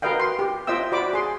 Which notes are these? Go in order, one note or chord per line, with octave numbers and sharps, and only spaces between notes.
F#4 A#4 B4 D#5 F5 G5
C6
G4
F4 C5 D#5 E5 G5 E6
F#4 C5 D5 B5 D6
G#4 C6